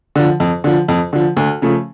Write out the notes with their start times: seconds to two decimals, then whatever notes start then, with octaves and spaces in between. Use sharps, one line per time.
0.16 D3 F3
0.40 F2
0.64 D3 F3
0.88 F2
1.13 D3 F3
1.37 D2
1.62 C#3 F3 A3